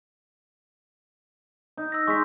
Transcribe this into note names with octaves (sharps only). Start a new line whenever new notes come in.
D#4
E6 A#6
G#3 D#4 C#6 B6